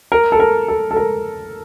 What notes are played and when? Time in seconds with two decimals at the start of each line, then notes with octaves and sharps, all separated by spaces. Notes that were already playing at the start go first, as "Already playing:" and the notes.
0.12 A#4
0.32 A4
0.40 A#4
0.68 A4
0.91 A4
0.97 A#4